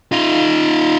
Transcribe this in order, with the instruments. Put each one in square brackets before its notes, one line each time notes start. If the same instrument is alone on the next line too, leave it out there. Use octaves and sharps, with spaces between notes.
[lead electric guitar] D#4 F4